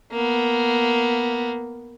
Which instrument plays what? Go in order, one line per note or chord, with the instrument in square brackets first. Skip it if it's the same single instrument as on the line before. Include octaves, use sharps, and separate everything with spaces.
[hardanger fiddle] A#3 B3